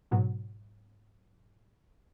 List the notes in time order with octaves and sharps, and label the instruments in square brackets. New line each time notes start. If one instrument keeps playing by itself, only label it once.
[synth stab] G#2 B2 F#3